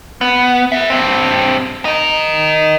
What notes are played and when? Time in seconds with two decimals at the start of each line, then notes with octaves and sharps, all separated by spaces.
0.21 B3
0.72 A#4 E5
0.90 G2 C4
1.85 D#4 A#4